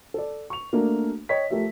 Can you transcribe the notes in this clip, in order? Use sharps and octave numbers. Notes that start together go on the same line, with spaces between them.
A4 D5
C#6 F7
A3 A#3 D4 F#4 A#4
C#5 D#5 G5 B6
F3 A3 G4 A#4 E5